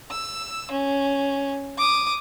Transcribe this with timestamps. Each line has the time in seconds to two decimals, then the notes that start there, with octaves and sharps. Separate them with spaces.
0.11 E6
0.71 C#4
1.78 D6 D#6